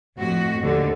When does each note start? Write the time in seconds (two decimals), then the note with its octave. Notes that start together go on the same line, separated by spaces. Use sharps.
0.17 F2 A2 F#4
0.60 D#2 D3